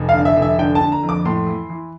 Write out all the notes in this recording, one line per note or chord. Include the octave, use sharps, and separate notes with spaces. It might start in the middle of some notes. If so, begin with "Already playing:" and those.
Already playing: F1
F5
D3
E5
F1
E5
D3 G5
A5
D3
A#5
F2
D6
A2 C6
E3
E3